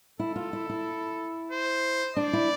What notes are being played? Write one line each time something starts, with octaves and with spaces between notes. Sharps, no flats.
E4 A4
F4
E4
E4
C5
D4 D5
E4